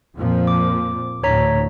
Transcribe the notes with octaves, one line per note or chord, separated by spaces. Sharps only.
F2 A#2 F3
D6
D2 A2 C#5 A#5 B6